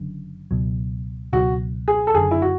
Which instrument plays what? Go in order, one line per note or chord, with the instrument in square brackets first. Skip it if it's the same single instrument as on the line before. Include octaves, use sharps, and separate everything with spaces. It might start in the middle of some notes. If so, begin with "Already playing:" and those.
Already playing: [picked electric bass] F#1 F#2 D3
C#2 B2 F#3
[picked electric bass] C#2 B2 F#3 [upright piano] F#4
[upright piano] G#4
A4
[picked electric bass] F#1 F#2 D3 [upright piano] G#4
[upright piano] E4
F#4